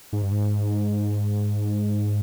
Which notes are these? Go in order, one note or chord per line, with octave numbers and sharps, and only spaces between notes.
G#2
G2
G#2